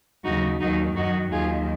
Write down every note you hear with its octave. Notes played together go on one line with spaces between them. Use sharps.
D#2 C#3 F#3 D#4 F#4
D#2 D#3 F#3 D#4 F#4
F#2 D#3 F#3 D#4 F#4
D#2 D#3 F#3 F4 G#4